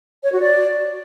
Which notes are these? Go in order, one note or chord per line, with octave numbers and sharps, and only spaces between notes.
C#5
F#4
D5